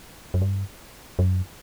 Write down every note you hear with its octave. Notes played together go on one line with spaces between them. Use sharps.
F#2
G2
F#2